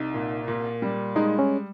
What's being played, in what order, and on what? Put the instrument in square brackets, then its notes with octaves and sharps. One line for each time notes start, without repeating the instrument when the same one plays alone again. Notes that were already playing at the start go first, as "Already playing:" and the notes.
Already playing: [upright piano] C2 [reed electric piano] D#4
[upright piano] A#2
A#2
G3
[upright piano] G#3 [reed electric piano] D#4
[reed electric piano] C#4